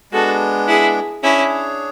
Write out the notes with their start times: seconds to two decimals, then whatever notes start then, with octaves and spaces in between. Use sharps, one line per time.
0.12 G#3 B3 D4 F#4 A4
0.67 E4 G#4
1.22 C#4 D4 E4 G#4 C#5